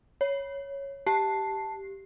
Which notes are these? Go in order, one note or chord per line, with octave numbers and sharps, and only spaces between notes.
C#5
G4 A5 C7